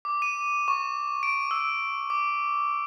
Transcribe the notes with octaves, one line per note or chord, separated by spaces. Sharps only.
D6
D#7
C#6
D7
E6
D6